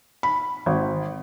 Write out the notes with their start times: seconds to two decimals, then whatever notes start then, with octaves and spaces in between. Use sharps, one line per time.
0.23 B5
0.66 G#1